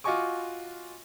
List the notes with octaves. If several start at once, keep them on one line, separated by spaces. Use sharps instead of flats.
F4 F#4 D#5 G#5 C#6 D6